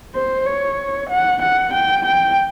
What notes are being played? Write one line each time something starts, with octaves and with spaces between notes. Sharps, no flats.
C5
C#5
F#5
F#5
G5
G5